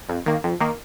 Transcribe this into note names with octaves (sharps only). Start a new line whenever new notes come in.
F2
D#3 A#3
F2
D#3 A#3